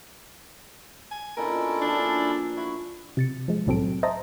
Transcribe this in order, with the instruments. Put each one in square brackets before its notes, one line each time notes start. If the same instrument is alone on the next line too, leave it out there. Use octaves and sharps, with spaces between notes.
[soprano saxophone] G#5
[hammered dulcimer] B2 D3 F4 [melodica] C#4 E4 A4 [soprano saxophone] A#4
[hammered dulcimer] D3 F3 A#3 [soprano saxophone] D4
[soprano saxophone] E4 [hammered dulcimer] F#4
[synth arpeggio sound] C3 A6 C#7
F3 G#3
C2 A2 F#3 C4 A4 D7
C5 D#5 E5 A5 A#5